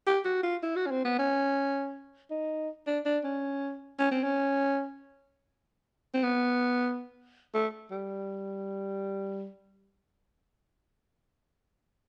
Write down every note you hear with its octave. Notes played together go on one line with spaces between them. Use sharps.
G4
F#4
F4
E4
F#4
C#4
C4
B3
C#4
D#4
D4
D4
C#4
C#4
C4
C#4
C4
B3
A3
G3